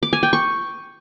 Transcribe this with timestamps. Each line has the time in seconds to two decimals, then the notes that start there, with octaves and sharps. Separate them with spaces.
0.03 D6
0.13 G#5
0.23 G5
0.33 C#6